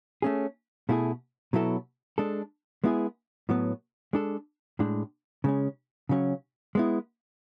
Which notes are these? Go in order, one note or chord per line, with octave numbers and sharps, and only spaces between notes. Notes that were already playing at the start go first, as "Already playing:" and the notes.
A3 C#4 G#4
B2 A3 E4 G#4
B2 F#3 B3 E4 A4
G#3 D4 A4
G#3 B3 E4 G#4
A2 F#3 B3
G#3 D4 A4
A2 G#3 D4
C#3 G#3 C#4
C#3 F#3 C#4
G#3 B3 E4